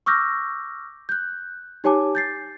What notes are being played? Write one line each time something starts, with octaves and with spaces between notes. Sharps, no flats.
C#6 D6 E6 F6 G6 A#6
F#6 G6
D#4 G4 C#5 G#5 A5 D6
G6 A6 C7